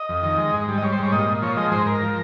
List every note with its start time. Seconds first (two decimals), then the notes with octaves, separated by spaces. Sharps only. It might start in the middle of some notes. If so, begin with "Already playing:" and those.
Already playing: D#5
0.09 F2
0.23 D#3
0.38 G#3
0.54 G#2
0.68 G3
0.78 D#5
0.82 G3 C#5
0.92 C5
0.98 G#2
1.03 C#5
1.12 A#2 D#5
1.28 A#2
1.42 F3 C#5
1.57 G#3 D#5
1.71 G#2 C5
1.86 G#2 A#4
2.02 F3